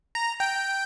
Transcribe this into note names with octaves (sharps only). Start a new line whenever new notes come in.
A#5
G5